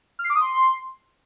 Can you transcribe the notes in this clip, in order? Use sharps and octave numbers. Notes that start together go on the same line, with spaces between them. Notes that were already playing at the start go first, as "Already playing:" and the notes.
F6
C7
D6
D#6
C6